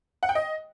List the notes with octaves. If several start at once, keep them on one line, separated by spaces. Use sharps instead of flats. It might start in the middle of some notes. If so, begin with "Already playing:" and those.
F#5
G5
D#5